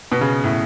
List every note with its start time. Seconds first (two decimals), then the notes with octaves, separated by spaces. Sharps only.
0.12 B2
0.21 C#3
0.44 A2